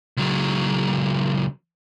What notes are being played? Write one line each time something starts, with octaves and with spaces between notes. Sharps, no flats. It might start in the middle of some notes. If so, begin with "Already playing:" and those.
C#2 F#3